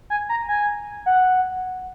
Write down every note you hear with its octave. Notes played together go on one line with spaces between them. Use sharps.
G#5
A#5
G#5
F#5